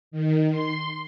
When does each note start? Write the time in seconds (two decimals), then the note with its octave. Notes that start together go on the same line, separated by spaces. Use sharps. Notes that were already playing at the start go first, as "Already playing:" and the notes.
0.11 D#3
0.51 C6